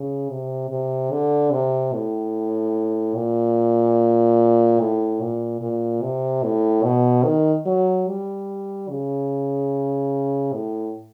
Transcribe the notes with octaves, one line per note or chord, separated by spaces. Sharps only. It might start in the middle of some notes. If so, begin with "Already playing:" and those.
Already playing: C#3
C3
C3
D3
C3
A2
A#2
A2
A#2
A#2
C3
A2
B2
D#3
F#3
G3
C#3
A2